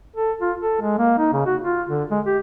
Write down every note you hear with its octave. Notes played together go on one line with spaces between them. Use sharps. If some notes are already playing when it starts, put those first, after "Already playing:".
A4
F4
A4
G#3
A#3
D#4
C#3
F#4
F4
D3
G#3
G4